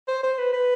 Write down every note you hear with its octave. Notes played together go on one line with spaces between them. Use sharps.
C5
C5
B4
B4